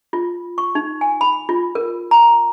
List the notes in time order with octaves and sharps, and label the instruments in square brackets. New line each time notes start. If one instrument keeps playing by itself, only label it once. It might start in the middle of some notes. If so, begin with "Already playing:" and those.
[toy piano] F4
C#6
D#4
G#5
B5
F4
A#4
A#5